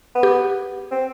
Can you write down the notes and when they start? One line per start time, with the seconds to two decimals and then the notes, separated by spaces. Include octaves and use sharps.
0.15 B3
0.23 G4
0.91 C4